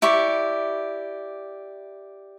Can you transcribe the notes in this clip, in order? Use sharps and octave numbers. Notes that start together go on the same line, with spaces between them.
E4 G4 D5 C#6